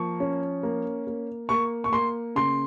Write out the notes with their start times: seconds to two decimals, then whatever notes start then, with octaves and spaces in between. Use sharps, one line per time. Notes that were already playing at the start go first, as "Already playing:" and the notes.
Already playing: F3 A#3 C#6
0.20 C#4
0.63 A#3
1.07 A#3
1.49 A#3 C#6
1.84 C#6
1.92 A#3 C6
2.36 C#3 C6